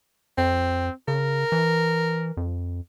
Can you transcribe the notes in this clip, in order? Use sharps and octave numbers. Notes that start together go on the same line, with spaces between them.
F2 C4
C#3 A#4
E3
F2